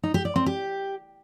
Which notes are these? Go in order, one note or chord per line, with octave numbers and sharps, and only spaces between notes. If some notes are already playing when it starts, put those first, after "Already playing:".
D#4
G4
D5
C4
G4